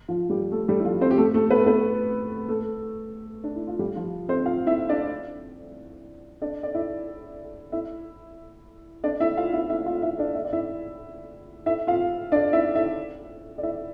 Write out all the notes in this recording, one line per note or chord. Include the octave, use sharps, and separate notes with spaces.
F3 F4
G3 G4
A3 A4
G3 G4
E4
F3 F4
C4 C5
G4
A3 A4
A3 A4
B3 B4
B3 B4
A3 A4
D4
E4
F4
G3 G4
F3 F4
C4 C5
F4 F5
E4 E5
D4 D5
D4 D5
D5
E4 E5
E4 E5
D4 D5
E4 E5
F4 F5
E4 E5
E4 E5
F4 F5
E4 E5
D4 D5
E5
D5
E4 E5
E4 E5
F4 F5
D4 D5
E4 E5
E4 E5
D5
E4 E5